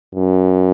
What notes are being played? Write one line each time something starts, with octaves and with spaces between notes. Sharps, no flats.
F#2